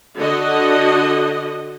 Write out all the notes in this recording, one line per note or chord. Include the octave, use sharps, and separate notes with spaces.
D3 F#4 D#5